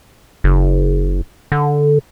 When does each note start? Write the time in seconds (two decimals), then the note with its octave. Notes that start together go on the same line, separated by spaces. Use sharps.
0.44 F#1
1.52 D3